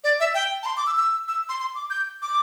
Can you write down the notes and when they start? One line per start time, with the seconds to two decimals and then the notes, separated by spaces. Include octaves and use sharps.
0.04 D5
0.20 E5
0.34 G5
0.63 A5
0.66 C6
0.77 D6
0.87 E6
0.97 E6
1.28 E6
1.49 C6
1.60 C6
1.75 D6
1.90 G6
2.22 D6